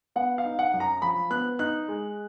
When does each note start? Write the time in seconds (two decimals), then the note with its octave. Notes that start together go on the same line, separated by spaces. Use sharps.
0.16 B3 F#5
0.38 F5
0.45 D#4
0.59 F#5
0.74 F#2
0.80 A#5
1.02 F3 B5
1.30 B3 F#6
1.59 D#4 F#6
1.88 G#3